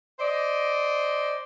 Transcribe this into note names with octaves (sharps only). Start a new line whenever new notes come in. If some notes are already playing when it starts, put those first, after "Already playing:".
C5 D5 D#5